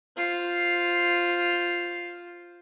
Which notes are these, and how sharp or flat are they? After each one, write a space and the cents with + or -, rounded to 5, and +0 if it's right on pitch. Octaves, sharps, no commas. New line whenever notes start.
F4 +0 C5 +0